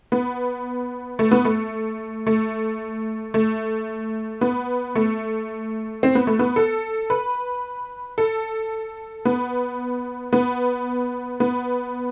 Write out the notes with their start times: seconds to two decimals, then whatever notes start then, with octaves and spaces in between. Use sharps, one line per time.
0.12 B3
1.19 A3
1.31 B3
1.45 A3
2.27 A3
3.34 A3
4.41 B3
4.95 A3
6.03 C4
6.15 B3
6.27 A3
6.39 B3
6.56 A4
7.10 B4
8.18 A4
9.25 B3
10.33 B3
11.40 B3